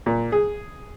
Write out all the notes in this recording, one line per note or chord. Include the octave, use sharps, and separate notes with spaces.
A#2
G#4